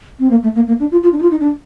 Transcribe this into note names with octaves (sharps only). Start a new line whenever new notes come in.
C4
A#3
A3
A#3
A#3
D4
F4
F4
D4
D#4
F4
D#4
D4